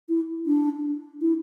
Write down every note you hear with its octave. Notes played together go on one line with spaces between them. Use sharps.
E4
D4
E4